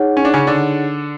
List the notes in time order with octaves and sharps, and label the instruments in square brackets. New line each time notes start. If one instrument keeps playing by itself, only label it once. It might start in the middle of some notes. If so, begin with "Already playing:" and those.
Already playing: [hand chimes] D#4 G#4 C#5 F#5
[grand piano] C#4
D4
C#3 C#4
D3 D4